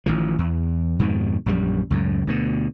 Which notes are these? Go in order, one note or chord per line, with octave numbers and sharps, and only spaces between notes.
A1 D#3 F3
E2
F2 G#2 B2 D#3
A#1 F#2 E3 G3
C#2 F#2 A2
D2 B2 D3